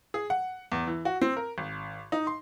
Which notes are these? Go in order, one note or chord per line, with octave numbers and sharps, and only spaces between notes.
G#4
F#5
E2
E3
F#4
C4
A#4
G#1
D#4
C6